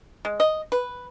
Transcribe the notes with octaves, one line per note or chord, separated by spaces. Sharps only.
G#3
D#5
B4